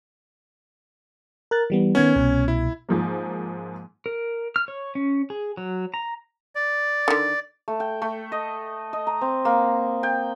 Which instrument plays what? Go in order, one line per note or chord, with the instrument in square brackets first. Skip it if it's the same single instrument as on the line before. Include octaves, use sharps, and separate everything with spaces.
[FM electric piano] A#4 F#6 A6
E3 G3 B3
[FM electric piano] D#3 B3 [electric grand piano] C#4 G#6
[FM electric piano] C2 B2
[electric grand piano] E4
[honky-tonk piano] G#2 F3 A#3
[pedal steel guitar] A#4
F6
C#5
C#4
G#4
F#3
A#5
[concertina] D5
[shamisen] D3 D#3
[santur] A3
G5
A3
D#5
D#5
A#5
C4
A#3
G5